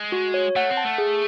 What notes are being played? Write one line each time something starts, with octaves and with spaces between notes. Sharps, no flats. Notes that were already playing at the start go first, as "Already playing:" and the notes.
Already playing: G#3
F#4
C#5
A3 F#5
C4
A5
A3
G#4